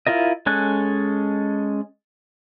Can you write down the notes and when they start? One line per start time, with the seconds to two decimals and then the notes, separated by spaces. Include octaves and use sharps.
0.07 E4 F4 A#4 D#5
0.46 G#3 C#4 A4 G#5 F#6